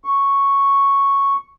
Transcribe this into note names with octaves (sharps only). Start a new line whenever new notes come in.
C#6